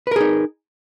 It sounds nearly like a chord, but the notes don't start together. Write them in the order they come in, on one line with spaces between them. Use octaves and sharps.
B4 A#4 G#4 D#4